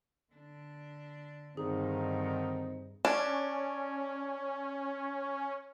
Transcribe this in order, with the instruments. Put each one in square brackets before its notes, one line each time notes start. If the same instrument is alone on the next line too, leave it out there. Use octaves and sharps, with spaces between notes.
[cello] D3 D4
[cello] G2 [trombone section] D3 D#3 D#4 [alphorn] C4 [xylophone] G#4
[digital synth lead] C#4 [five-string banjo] D4